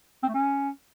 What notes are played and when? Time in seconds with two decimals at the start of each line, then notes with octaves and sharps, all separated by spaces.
0.23 C4
0.29 A3
0.34 C#4